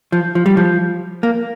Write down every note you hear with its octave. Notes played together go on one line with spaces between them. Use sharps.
F3
F3
G3
F3
A#3